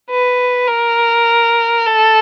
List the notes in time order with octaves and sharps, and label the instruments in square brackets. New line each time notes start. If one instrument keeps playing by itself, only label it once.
[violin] B4
A#4
A4